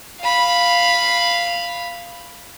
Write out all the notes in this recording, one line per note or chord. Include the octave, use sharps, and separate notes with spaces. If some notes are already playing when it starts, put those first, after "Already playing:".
F5 B5